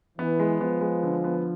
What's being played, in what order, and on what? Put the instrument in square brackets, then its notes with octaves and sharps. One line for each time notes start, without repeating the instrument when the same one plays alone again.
[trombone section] E3 [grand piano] B3
[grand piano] G#3
[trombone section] F3 [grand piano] B3
[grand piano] G#3
D3
B3